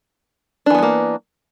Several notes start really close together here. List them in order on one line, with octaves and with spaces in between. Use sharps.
D4 E3 B3 G#3 A#3